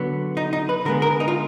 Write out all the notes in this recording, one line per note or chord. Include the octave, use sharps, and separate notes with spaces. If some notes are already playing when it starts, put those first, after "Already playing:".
Already playing: D3 F#3 B3
D#4
D#4
B4
D3 G#3 B3 A#4
A#4
D#4
F4